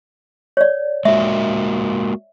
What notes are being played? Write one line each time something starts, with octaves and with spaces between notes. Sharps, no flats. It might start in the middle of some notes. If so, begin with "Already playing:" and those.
C#5 D5
G#3 A#3 F#4 E5